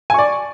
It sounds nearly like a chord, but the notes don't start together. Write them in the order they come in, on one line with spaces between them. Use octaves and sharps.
G#5 C#6 D5